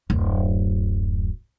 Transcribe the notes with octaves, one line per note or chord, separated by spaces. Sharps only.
D1 F#2